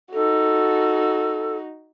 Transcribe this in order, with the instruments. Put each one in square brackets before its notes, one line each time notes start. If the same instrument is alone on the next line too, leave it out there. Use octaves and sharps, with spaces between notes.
[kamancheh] D#4 F#4 [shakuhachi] A4